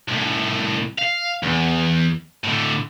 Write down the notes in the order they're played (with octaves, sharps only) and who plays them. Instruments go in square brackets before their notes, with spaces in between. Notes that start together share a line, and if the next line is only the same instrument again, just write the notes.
[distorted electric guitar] C2 A2
F5
E2
A2 D3